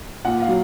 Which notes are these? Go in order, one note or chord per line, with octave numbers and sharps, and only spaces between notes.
A#2 F#5
F5
F#3